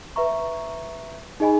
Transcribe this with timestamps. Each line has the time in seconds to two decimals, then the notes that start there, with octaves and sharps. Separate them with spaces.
0.16 B4 E5 A#5 C#6
1.40 D#4 G#4 D#5 G#5 B5